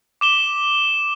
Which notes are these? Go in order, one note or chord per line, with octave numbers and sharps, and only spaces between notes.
D6 E7 G7